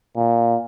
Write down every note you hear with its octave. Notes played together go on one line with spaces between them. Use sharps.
A#2